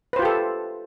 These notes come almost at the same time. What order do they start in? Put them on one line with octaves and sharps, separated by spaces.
B4 C5 F4 G4 A4